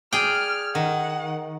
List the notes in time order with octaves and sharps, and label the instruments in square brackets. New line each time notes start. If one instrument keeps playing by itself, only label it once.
[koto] G#4 D5 G5 [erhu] F6
[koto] D#3 [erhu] F#5